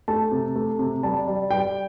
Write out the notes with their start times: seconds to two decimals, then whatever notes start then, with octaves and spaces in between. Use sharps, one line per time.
0.08 A3 A5
0.32 C3
0.56 A3
0.79 C3
1.03 G3 A5
1.27 G3
1.51 G3 G5